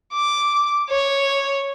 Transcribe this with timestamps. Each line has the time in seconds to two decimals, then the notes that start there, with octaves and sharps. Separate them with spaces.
0.13 D6
0.90 C#5